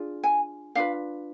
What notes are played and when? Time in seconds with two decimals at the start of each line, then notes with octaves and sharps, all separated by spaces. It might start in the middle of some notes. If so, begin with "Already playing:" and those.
Already playing: D4 F4 G#4
0.23 G#5
0.75 D4 F4 B4 F5